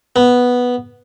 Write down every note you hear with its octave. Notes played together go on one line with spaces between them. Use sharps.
B3